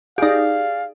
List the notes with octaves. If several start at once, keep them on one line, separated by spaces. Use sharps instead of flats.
D#4 G4 G#4 D5 F5